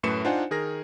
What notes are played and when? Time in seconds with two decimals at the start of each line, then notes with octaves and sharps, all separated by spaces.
0.03 F#2 A2 A3 B4 C#7 E7
0.25 D4 D#4 F4 C5 F#5 G#5
0.51 D#3 G#4 A#4 A#6